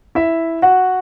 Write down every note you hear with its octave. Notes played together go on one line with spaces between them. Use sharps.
E4 E5
F#4 F#5